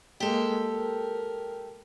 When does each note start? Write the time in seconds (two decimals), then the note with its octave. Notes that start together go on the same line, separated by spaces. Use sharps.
0.20 G#3 A#3 G4 A4
0.69 A#4